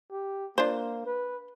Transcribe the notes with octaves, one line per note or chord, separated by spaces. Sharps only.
G4
A#3 D4 F4 C5
B4